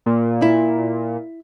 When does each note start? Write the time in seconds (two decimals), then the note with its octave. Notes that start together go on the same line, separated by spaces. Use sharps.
0.06 A#2
0.42 E4